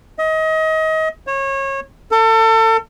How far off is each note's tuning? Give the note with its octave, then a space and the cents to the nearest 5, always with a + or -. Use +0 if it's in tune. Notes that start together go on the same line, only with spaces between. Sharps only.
D#5 +30
C#5 -25
A4 +35